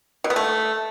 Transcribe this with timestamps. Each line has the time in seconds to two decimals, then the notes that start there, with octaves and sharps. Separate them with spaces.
0.24 B2
0.30 B3
0.36 A3